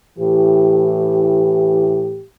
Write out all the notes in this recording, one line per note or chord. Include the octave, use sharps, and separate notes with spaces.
A2 E3 G4